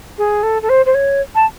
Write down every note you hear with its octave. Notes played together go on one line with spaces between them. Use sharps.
G#4
A4
A4
C5
C5
C#5
A5